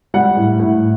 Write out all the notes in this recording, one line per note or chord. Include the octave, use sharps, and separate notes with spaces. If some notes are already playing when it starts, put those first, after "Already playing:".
G3 F#5
A2
A2